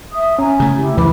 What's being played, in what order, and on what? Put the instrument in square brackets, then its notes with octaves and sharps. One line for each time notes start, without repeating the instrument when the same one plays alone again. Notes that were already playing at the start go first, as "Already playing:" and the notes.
[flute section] E5 D#6
[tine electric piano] C#4 [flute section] G#5 A#5
[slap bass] C#3 A3
[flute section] E4 G4
[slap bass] D#2 C#3 F3 [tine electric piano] E3 [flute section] B5 D6